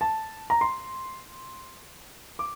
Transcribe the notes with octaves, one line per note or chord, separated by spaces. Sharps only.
A5
A#5
C6
D6